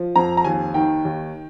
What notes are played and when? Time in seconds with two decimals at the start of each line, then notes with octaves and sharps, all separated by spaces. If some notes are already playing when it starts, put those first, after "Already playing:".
Already playing: F3
0.16 F2 A#5
0.37 A#5
0.44 D#2 G#5
0.74 D#3 G5
1.05 D#2